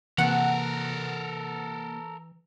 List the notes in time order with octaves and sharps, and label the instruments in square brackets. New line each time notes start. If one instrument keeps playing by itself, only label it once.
[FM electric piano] C3 A#3 [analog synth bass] E3 [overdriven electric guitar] A4 A#4 [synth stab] F#5